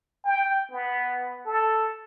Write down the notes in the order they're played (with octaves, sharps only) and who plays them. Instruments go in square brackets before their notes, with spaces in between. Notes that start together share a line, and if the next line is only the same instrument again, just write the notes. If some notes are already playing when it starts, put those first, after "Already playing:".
[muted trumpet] G5
B3
A4